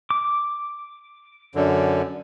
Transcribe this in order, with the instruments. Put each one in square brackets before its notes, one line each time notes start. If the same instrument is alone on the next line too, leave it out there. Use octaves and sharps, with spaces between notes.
[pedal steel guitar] D6
[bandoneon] F#2 D3